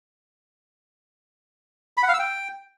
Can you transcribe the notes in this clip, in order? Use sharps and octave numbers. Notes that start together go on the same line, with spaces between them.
B5
F#5
F5
E6
G5